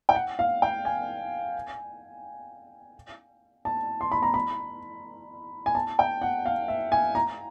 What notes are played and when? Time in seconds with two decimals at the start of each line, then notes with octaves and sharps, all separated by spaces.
0.09 G5
0.15 F#5
0.39 F5
0.62 G5
0.85 G#5
3.65 A5
4.01 C6
4.12 B5
4.23 A#5
4.34 B5
5.66 G#5
5.75 A5
5.99 G5
6.22 F#5
6.46 F5
6.68 E5
6.92 G#5
7.15 A#5